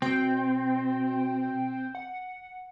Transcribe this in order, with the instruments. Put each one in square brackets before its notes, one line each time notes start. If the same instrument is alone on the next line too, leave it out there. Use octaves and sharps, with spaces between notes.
[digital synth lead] B2 [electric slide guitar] C4 [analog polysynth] G5
[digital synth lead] F#5